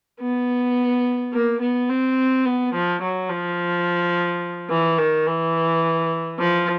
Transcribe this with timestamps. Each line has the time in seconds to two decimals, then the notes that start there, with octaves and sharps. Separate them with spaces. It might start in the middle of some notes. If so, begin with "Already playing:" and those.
0.21 B3
1.33 A#3
1.61 B3
1.90 C4
2.46 B3
2.74 F3
3.01 F#3
3.29 F3
4.70 E3
4.98 D#3
5.27 E3
6.39 F3